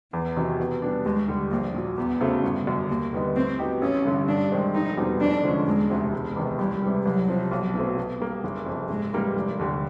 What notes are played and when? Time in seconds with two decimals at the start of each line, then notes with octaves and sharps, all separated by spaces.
0.12 E2 E3
0.37 C3 D#3 F#3
0.60 B2
0.82 G3 B3 D4
1.05 D#2 G#3
1.28 D3 G3
1.51 A#1 A#3
1.74 A#2 F#3
1.98 E2 B3
2.20 C#3 F#3 A3 C4
2.43 G1
2.67 F#2 D3
2.90 D#2 A#3
3.13 D3 G3 B3 D#4
3.36 A2 C4
3.59 F#3 B3 D#4 G4
3.81 A1 C#4
4.05 G2 D3
4.28 G2 D4
4.52 D#3 G#3 C4
4.75 F1 D#4
4.97 E2 B2 G3 C4
5.20 F2 D4
5.43 D3 F3 G#3 C#4
5.67 E1 G#3
5.90 D2 C3
6.13 E1
6.36 E2 C3 D#3
6.59 C#2 G3
6.83 C3 E3 G3
7.05 C2 F#3
7.28 C3 F3
7.51 B1
7.74 B2 F#3 A3 C4
7.98 B2
8.20 G3 A#3
8.44 F#1
8.66 F2 C3
8.90 G#2 G#3
9.12 E3 G3 A#3
9.36 F1
9.59 D#2 D3 G3